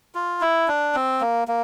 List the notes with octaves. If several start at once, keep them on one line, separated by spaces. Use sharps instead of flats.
F4
E4
D4
C4
A#3
A#3